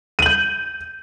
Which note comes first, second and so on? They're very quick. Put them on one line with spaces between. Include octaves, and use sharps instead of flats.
D#7 F#7 G6